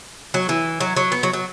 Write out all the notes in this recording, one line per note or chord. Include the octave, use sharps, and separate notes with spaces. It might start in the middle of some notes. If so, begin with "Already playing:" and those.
F#3
E3
F#3
F#3
B3
F#3
F#3